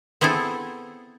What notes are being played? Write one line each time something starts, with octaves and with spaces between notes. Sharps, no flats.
B3 C4 E4 G#4 A4